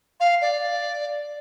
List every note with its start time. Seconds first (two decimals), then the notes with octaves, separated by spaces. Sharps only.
0.20 F5
0.42 D5